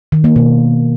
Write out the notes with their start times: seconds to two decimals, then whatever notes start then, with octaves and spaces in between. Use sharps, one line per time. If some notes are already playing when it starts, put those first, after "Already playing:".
0.12 D#3
0.24 A#3
0.36 B2